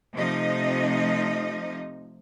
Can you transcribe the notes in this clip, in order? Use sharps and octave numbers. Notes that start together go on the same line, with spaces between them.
C3 F3 A3 D#4 D#5